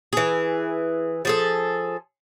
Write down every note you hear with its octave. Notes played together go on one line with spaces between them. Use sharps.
E3 G#4
F3 G#4 A4